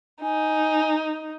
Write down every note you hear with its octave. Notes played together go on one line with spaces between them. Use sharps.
D#4 G#5